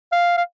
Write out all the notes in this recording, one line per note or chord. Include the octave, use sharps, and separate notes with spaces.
F5
F5